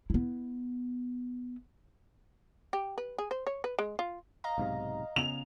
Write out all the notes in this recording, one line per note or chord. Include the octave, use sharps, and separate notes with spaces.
B3 E4
G4
B4
G#4
C5
C#5
B4
G#3
F4
D#5 F5 A#5
B1 G#2 C3
C#3 B3 C#4 F7